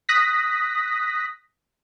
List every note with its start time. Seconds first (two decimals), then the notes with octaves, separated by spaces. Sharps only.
0.09 D#6 F#6 A#6 B6